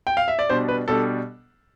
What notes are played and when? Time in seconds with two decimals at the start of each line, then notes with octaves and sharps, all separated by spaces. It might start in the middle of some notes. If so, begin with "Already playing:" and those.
0.07 G5
0.17 F5
0.28 E5
0.39 D5
0.49 B2 G3 D4 C5
0.68 B4
0.88 B2 G3 D4 A4